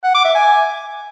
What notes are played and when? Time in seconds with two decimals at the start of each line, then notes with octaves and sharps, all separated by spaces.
0.04 F#5
0.14 D6
0.25 E5
0.35 G#5